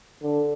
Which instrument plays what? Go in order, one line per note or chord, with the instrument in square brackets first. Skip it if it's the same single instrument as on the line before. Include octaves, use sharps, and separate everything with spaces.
[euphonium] D3